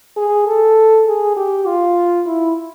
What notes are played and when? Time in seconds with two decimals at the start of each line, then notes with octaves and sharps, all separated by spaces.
0.17 G#4
0.47 A4
1.07 G#4
1.36 G4
1.67 F4
2.27 E4